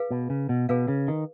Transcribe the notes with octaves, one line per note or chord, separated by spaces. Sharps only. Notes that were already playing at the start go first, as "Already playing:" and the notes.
Already playing: G#4 B4 F5
B2
C#3
B2
B2 G#4 B4 F5
C#3
D#3